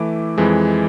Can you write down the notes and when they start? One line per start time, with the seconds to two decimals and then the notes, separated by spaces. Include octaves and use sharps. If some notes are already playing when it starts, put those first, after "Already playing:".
Already playing: E3 A3 E4 D6
0.38 F2 E3 G#3